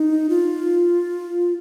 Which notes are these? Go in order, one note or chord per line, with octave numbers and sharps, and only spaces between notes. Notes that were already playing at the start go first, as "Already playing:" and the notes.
Already playing: D#4
F4